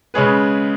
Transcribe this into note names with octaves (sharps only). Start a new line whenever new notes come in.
C#3 G#3 C#4 G#4 B4